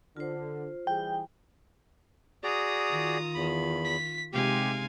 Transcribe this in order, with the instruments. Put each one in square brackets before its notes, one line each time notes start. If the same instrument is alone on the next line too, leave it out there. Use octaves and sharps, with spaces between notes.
[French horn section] D3 [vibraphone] F4 C5
[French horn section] E3 G3 G#4 [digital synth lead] G5
[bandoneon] F#4 G#4 D5 [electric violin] A#5 D#6
[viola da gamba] D#3 F4
[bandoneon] E2 B5
[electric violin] B6
[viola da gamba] C3 G#3 D#4 [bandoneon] G4 [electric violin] F5 G#5